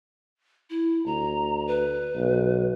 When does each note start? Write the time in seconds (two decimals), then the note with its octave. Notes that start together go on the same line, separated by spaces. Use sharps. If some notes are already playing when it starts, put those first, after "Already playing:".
0.70 E4
1.06 D2 A#5
1.67 B4
2.16 B1